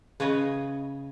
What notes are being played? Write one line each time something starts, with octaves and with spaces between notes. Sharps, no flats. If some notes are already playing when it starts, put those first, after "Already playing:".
C#3 B4 C#5 D#5